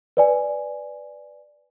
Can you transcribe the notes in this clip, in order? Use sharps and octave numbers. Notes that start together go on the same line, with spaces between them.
B4 D5 G#5